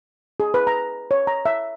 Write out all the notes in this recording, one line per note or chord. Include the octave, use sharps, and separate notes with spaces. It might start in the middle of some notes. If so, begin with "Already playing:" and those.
G#4
B4
A#5
C#5
A#5
E5